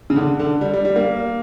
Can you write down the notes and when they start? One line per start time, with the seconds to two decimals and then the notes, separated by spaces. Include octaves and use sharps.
0.10 C#3
0.16 D3
0.39 D3
0.61 G3
0.73 G3
0.85 G3
0.96 A#3